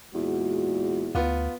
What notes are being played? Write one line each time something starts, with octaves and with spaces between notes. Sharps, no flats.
E2 A#2 G#3 F#4
D2 B3 F4